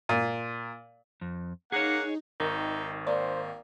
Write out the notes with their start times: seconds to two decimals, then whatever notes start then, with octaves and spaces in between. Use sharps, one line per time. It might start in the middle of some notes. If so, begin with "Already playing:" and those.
0.09 A#2
1.21 F2
1.72 A#3 D#4 G#4 C#5 F#5
2.40 G#1 D#3 D#4 A#4
3.07 A#3 C5 D5